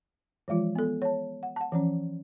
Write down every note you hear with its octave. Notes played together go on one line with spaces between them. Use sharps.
E3 F3 G#3 F4
B3 A4
C#5 A5
F#5
F#5 A5
E3 F3 C#4